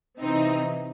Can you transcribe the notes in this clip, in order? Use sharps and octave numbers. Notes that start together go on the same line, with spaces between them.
C3 E3 C4 D#4